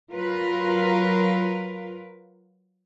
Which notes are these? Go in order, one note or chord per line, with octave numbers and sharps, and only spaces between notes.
F#3 F4 A#4 B4